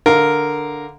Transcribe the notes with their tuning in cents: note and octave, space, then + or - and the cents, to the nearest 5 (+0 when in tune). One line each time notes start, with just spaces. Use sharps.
D3 +0 A#4 +0 F5 +0